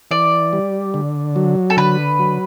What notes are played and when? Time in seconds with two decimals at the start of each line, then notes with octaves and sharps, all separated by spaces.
0.11 E3 D5
0.53 G3
0.94 D3
1.36 F#3
1.70 A4
1.77 D3 B4
2.19 F#3